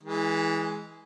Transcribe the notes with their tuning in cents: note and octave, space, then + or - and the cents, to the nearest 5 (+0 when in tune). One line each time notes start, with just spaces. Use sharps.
E3 -15 G#3 +0